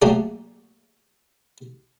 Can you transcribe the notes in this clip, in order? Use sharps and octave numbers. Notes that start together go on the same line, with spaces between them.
F#3 A3 A#3 C#4 G4 G#4